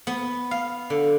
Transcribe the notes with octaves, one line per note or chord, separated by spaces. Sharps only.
B3
F5
D3